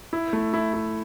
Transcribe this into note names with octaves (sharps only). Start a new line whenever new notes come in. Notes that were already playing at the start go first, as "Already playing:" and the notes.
E4
A3
E4
E4